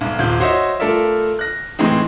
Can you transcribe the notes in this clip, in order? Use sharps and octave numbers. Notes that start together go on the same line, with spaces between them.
B1 G#2
D#1 G#1 F4 G6
F#4 C5 C#5 D#5 E5
A3 F4 A4 A#4 D5 E5
F#6 A#6
A2 E3 G#3 C4 D#4